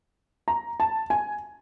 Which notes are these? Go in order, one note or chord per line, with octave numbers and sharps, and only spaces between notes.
A#5
A5
G#5